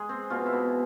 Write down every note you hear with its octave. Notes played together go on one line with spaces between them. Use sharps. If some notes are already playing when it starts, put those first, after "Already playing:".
Already playing: G#3 G#4
C4
B2 F4
E4
B2